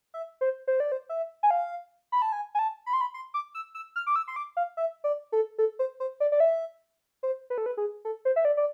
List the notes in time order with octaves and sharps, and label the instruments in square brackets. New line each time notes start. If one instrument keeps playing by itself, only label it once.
[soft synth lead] E5
C5
C5
D5
C5
E5
G#5
F5
B5
A5
G#5
G#5
A5
B5
C6
B5
C6
D6
E6
E6
F6
D6
E6
C6
D6
F5
E5
D5
A4
A4
C5
C5
D5
D5
E5
C5
B4
A4
B4
G#4
A4
C5
E5
D5
D5